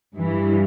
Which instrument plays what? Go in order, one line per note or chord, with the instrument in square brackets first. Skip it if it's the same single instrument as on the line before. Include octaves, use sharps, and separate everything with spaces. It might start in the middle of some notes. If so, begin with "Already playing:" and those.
[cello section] G2 E3